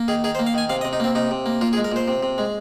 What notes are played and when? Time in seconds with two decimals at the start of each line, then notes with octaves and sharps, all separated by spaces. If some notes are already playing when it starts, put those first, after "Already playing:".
Already playing: A#3
0.08 D#3 G#4
0.24 D#3 G#4
0.35 C5
0.39 A#3
0.47 F5
0.54 D#3 G#5
0.69 C3 F5
0.81 D#5
0.85 C3
0.93 D#4
1.00 A#3 C4
1.15 C3 D#4
1.31 C3
1.46 A#3
1.61 A#2 F4
1.73 G#4
1.77 G#3
1.84 A#4
1.92 A#2 C5
2.08 C3
2.23 C3
2.38 G#3